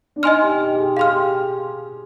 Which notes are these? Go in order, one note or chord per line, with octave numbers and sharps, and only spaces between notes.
D4
D#4 D#5 G#5 C6 F6
G4
G4
G4
G#4
G#4 F5 C6 F6
G4